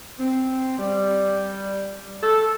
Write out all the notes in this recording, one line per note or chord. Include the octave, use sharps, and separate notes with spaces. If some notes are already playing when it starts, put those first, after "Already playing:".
C4
G3
A4